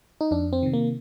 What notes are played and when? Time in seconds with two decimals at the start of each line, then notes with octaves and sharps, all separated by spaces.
0.21 D#4
0.31 F2 D4
0.53 C4
0.63 C3 D#3
0.73 A#3